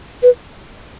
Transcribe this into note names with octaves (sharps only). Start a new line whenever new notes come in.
B4